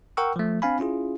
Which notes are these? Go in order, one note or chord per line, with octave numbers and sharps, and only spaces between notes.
A#4 F#5 G5 C#6 E6
F3 A3
C4 D4 F5 G#5 B5
C#4 E4 F4 G#4